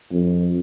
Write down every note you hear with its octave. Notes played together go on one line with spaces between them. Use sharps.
F2